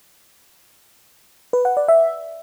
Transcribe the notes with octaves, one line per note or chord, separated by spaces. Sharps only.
B4
F#5
D5
E5